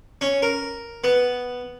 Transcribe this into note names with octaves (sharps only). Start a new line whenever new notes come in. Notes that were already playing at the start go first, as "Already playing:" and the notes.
C#4
A#4
B3